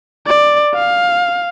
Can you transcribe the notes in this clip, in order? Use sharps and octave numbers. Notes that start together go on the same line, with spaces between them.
D5
F5